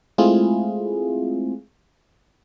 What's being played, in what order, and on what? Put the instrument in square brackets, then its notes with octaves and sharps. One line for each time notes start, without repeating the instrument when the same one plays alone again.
[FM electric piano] G#3 A3 C4 E4 F4 G#4